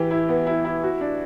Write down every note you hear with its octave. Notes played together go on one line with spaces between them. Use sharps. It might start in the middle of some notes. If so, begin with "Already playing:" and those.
Already playing: E3 G4
E4
B3
E4
E4
F#4
D4